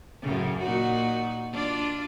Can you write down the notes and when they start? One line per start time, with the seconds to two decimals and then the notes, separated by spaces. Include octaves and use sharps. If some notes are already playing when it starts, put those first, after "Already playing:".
0.22 F#2 A2 C#3
0.62 A#2 D#4 F#4
1.51 D4 F4 D5